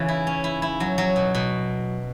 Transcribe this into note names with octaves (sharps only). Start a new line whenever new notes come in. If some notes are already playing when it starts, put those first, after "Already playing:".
Already playing: C#3 E3 C#4
E4
C#4
E4
E4
F#3
F#3
B2
B2